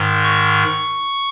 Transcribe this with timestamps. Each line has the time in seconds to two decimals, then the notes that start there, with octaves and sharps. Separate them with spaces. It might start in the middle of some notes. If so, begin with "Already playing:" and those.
Already playing: G#2 D#3
0.24 C#6